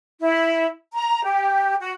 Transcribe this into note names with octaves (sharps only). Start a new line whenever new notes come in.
E4
A#5
G4
F#4